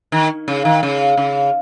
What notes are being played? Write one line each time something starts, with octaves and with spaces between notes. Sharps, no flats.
D#3
C#3
D#3
C#3
C#3